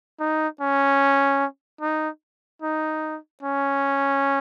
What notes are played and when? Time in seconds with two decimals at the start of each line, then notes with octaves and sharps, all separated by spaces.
0.20 D#4
0.61 C#4
1.81 D#4
2.62 D#4
3.43 C#4